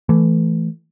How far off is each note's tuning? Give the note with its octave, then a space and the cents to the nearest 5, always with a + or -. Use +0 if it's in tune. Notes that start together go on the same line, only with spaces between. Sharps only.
E3 +15 A3 +0